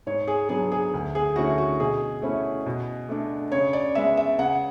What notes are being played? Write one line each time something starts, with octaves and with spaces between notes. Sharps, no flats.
G#2 C#5
G#4
F#3 B3 D4 G#4
G#4
D2
G#4
D3 A3 C#4 E4 F#4
F#4
B2 G#4
A3 C#4 E4
B2
A3 D4
C#3 C#5
D5
G#3 B3 E5
E5
C#3 F#5